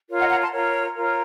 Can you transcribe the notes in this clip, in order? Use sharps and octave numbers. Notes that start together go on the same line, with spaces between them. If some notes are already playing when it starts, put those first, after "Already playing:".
F4 A#4 C#5
D#5 F#5
F#5 A#5
A5 C6
F4 A#4 C#5
F4 A#4 C#5